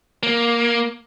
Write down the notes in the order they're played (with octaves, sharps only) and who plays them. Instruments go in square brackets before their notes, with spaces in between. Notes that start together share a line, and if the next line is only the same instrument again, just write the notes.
[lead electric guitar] A#3